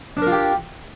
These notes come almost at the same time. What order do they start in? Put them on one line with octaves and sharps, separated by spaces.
D4 A#4 F4 G4